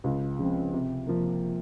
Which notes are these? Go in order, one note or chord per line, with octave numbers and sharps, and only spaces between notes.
C#2
C#3 F3 C4
C3
F3 A#3